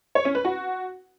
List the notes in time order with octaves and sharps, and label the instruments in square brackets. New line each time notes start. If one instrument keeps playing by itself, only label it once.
[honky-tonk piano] C#5
C#4
B4
F#4